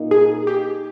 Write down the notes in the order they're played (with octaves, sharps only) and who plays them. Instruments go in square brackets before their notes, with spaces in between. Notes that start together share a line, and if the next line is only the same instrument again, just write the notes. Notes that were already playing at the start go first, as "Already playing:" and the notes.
Already playing: [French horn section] A#2 A#3 D#4
[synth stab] G#4
G4